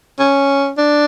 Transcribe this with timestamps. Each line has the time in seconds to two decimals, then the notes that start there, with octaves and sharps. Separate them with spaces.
0.20 C#4
0.78 D4